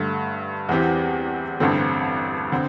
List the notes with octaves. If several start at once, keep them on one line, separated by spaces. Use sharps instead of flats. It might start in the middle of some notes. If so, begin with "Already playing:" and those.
Already playing: G2 D3 A3
E2 E3 C4 G4
A1 G2 D3 C4 A4
D3 C4